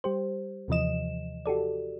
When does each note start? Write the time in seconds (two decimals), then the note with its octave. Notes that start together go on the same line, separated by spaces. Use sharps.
0.04 G3 G4 C5
0.68 D#2 C3 E3 F3 D#5 E7
1.46 F#4 G4 A4 D5